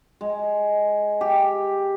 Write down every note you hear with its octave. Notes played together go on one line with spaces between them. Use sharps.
G#3
G4